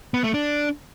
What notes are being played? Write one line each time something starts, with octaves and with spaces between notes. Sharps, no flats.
B3
A3
D4